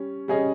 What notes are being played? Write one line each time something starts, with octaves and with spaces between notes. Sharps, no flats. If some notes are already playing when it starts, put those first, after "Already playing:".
Already playing: G3 C#4
G3 C#4 G#4 D#5